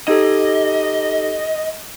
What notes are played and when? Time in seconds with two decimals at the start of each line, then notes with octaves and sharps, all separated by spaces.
0.08 D#4 G4 A4 D#5